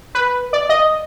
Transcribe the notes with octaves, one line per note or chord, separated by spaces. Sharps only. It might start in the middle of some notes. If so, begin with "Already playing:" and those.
B4
D5
D#5